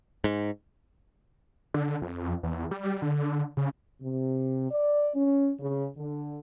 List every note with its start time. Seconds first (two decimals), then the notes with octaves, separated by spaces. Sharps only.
0.24 G#2
1.74 D3
2.02 F2
2.43 E2
2.71 G3
3.02 D3
3.57 C#3
4.02 C3
4.71 D5
5.15 C#4
5.60 C#3
5.97 D3